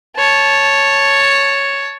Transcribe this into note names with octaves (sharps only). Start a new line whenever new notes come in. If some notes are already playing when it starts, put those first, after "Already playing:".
C#5 A5